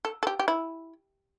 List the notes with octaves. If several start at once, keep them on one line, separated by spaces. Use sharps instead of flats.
A4
A4
G4
G4
E4